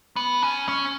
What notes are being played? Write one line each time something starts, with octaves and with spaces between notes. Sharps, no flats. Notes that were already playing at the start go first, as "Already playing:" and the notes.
B3
C#4
C#4